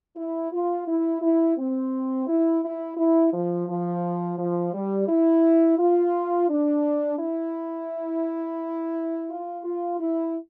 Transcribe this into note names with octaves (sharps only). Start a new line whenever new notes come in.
E4
F4
E4
E4
C4
E4
E4
E4
F3
F3
F3
G3
E4
F4
D4
E4
F4
F4
E4